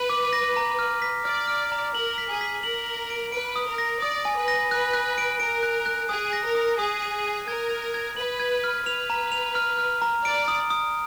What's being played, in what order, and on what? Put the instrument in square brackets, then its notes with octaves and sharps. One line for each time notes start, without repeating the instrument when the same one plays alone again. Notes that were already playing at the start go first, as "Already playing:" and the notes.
Already playing: [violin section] B4
[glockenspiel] D6
A#6
A#5
F6
B6
[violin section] D5 [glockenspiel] F6
[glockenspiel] F6
A#5
[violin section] A#4 [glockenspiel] F#7
[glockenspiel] B6
[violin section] G#4
[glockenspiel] B6
[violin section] A#4 [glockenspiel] F#7
[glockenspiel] F#7
D7
[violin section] B4 [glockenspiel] D7
[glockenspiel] D#6
[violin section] A#4
[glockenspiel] A#6
[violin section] D5 [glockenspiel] D#6
[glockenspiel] G#5
[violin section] B4
[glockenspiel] A#6
[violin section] B4 [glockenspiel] F#6
[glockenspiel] F#6
D7
[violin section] A#4 [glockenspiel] D7
[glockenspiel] F#6
F#6
[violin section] G#4 [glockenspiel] D#6
[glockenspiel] A#6
[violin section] A#4
[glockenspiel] D#6
[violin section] G#4 [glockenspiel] D#6
[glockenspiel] D#7
D#7
[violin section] A#4 [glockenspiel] G#6
[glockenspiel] G#6
G#6
[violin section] B4 [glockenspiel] F#7
[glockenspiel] G#6
F6
[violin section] B4 [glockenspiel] F7
[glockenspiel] A#5
F7
F6
F6
A#5
[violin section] D5 [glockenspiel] D7
[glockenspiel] D#6
D#6